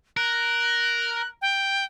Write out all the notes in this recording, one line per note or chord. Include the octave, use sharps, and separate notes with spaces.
A#4 F#6
G5